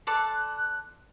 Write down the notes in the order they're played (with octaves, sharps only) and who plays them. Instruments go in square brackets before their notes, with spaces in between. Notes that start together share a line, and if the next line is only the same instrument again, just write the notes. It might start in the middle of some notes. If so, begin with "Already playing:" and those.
[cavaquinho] A4 D5 C6 [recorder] F#6